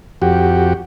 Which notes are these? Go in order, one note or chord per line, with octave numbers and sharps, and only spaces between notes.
F2 F#4 G4